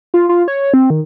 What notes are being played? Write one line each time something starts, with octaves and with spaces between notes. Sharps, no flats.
F4
F4
C#5
C4
D#3